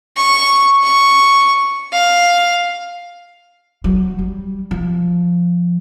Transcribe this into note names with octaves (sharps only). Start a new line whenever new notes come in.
C#6
C#6
F5
F#3
G3
F3